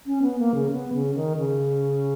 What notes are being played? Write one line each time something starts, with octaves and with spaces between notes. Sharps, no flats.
C#4
B3
A#3
C#3
B3
C#3
D#3
C#3